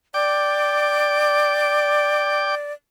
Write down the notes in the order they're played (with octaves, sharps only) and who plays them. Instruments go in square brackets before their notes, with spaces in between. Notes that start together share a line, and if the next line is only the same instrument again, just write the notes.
[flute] D5 [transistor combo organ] G5 D6